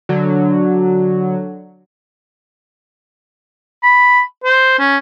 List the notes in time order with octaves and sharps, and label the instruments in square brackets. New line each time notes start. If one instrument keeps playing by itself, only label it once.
[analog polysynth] D3 F#3
[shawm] B5
C5
C#4